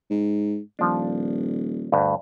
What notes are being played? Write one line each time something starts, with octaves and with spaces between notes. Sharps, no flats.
G#2
D#1 F3 D4
D2 G2